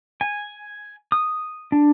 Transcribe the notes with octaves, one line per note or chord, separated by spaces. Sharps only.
G#5
D#6
D4